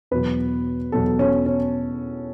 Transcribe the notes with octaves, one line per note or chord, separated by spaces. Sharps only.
E2 B2 F#3 B4
E2 B2 F#3 A4
C#4
C#4